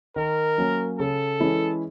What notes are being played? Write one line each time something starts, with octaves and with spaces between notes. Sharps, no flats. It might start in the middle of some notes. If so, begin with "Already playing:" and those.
D#3 A#4
F#3 A#3 C#4
C#3 A4
E3 G#3 C#4 E4